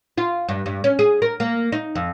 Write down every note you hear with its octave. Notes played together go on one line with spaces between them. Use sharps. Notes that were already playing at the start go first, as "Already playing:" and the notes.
F4
G2
G2
C#4
G#4
A#4
A#3
D#4
F2